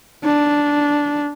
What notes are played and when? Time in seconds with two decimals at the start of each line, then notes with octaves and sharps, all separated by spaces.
0.24 D4